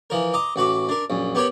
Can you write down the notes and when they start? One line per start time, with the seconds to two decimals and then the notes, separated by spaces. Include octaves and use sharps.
0.10 E3 F3 A#4
0.34 D#5 A#5 D6
0.56 A1 F#4 B4 D6
0.89 D4 A#4
1.10 A#1 F#2
1.35 B3 G4 A#4 C#5 B5